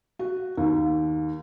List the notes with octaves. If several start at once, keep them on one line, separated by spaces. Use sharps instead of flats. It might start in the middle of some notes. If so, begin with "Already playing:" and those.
F#4
D#2